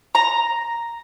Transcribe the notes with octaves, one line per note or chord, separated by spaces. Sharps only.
A#5